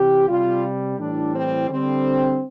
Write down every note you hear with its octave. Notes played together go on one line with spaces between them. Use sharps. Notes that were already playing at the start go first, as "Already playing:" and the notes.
Already playing: C3 E3 G4
C3 G3 F4
A2 E3 G3 D4
C4
D3 G3 C4